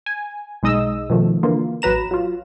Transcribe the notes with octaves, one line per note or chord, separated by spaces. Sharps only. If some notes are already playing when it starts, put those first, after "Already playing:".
G#5
B1 G#3 D#4 D#5 D#6 E6
B2 D#3 F3 A3
D3 E3 A#3 F4
A1 F#3 B4 A#5 E7
F#3 F4